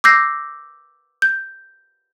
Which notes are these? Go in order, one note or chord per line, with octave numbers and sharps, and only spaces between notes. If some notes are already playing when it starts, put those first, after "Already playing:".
D6 E6 G6 A#6 C7
G6